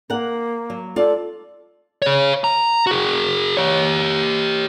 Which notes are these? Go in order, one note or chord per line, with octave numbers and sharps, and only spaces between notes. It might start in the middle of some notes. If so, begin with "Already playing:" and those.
A#3 A#4 F#5
F#3
F4 A4 D5
G#4 C#5
A#5
F#4 G#4
G4 C#5